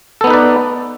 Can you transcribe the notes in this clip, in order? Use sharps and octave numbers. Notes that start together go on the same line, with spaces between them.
B3 D#4 A4 B4 D5